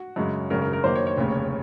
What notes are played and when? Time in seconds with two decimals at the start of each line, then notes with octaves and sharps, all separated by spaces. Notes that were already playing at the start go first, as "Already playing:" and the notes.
Already playing: F#4
0.16 F#2 C#3 G#3
0.50 G#1 F#2 C#3 A#4
0.62 A#4
0.73 A#4
0.84 F#2 D#3 A#3 C5
0.95 C#5
1.07 C#5
1.18 F1 D#2 C#3